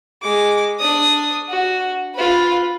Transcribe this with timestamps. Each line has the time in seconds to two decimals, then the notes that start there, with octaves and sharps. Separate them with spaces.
0.23 G#3 D6
0.79 D4 D#6
1.48 F#4
2.15 F4 B4